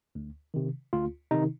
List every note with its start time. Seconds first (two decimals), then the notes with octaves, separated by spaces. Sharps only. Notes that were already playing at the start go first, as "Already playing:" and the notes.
0.15 D2
0.54 C3 D#3
0.93 D2 F4
1.31 C3 D#3 D#4